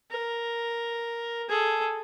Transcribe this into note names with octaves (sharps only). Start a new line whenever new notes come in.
A#4
G#4 A4